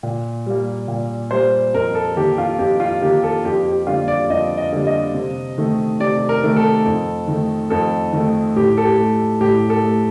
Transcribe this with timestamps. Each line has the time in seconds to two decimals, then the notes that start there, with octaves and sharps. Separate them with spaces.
0.03 A#2
0.46 G3 A#3
0.88 A#2
1.31 G3 A#3 C5
1.74 F2 A#4
1.95 A4
2.16 D#3 A#3 G4
2.38 F4
2.59 F2 G4
2.80 F4
3.01 D#3 A#3 G4
3.24 A4
3.45 F2 G4
3.66 G4
3.87 D3 G3 A#3 F4
4.08 D5
4.30 F2 D#5
4.58 D#5
4.72 D3 G3 A#3
4.87 D#5
5.14 C3
5.58 D#3 A3
6.00 C3 D5
6.29 A#4
6.43 D#3 A3
6.56 A4
6.85 F2
7.27 D#3 A3
7.70 F2 A4
8.13 D#3 A3
8.56 A2 G4
8.78 A4
8.85 G4
8.98 A3
9.41 A2 G4
9.70 A4
9.84 A3